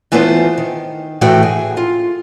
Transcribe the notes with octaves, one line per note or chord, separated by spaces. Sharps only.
E3 A3 B3 F4 C5
D#3
A2 E3 A3 F#4 G5
G#4
F4